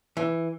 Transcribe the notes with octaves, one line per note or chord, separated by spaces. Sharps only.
E3